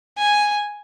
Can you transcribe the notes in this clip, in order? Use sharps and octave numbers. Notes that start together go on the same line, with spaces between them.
G#5